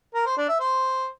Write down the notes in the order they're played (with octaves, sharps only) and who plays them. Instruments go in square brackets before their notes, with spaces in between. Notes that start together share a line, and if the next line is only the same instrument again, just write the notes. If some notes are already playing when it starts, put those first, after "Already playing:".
[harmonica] A#4
C5
D4
E5
C5